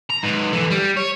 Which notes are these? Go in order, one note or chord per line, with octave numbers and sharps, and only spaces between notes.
A#5
G#2 B4
D3 E3
G3
C#5